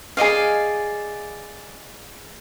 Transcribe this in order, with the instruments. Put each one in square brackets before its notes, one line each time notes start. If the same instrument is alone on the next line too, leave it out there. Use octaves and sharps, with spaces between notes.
[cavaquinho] G#4 D5 D#5 F5